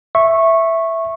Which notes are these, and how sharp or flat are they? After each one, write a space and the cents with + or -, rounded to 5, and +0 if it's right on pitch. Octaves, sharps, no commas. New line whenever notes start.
E5 +0 C#6 -15